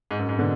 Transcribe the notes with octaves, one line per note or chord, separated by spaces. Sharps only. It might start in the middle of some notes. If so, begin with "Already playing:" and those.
G#2
F#2
G#2
B2 D3